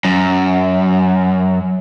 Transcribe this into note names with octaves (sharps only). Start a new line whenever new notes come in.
F#2